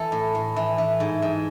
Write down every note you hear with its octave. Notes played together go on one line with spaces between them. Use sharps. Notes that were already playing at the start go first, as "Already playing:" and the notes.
Already playing: E3 A4
A2
A2
E3
E3
G#2
G#2